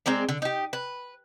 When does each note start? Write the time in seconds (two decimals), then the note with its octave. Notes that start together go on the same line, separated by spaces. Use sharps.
0.06 G#3 C4 A#4 D5
0.29 D3
0.42 D#4 G4
0.73 B4